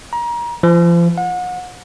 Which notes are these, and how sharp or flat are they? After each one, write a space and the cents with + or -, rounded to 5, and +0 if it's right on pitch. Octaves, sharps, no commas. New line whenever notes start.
A#5 +30
F3 -35
F#5 -35